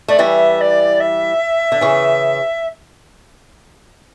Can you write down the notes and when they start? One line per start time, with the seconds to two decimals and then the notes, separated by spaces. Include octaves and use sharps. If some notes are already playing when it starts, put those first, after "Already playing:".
0.08 A3 D5
0.19 E3 G3 E5
0.60 D5
1.00 E5
1.72 D3
1.81 C#3 E3